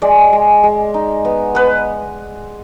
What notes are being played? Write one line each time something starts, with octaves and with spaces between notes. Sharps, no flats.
G#3 D5
G#3
G#3
D#4
B3
B3 B4